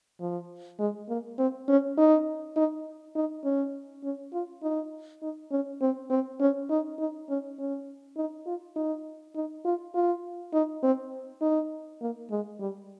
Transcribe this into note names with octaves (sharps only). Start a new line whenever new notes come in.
F3
G#3
A#3
C4
C#4
D#4
D#4
D#4
C#4
C#4
F4
D#4
D#4
C#4
C4
C4
C#4
D#4
D#4
C#4
C#4
D#4
F4
D#4
D#4
F4
F4
D#4
C4
D#4
A#3
G#3
G3